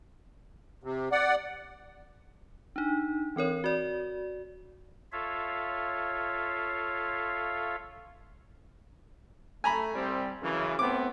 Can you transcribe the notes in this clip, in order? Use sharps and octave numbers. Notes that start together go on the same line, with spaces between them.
C3
D5 F#5
D4 D#4
E3 C4 A#4 C#5
F#4 D5
F4 A4 C#5 E5 F5
A3 G#5 A#5 B5
C2 G3 C4
F#2 C#3 E3
A2 B3 C4 D6